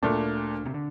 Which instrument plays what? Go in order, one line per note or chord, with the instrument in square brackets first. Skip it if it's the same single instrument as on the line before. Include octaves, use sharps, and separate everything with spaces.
[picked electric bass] D2 D3 [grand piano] A#2 A3 D4
[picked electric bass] C3
D3